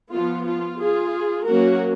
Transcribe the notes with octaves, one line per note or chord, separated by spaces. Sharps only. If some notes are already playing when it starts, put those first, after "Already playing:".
F3 B3 F4
F4
F4 G#4
F#3 A#3 C#4 F#4 A#4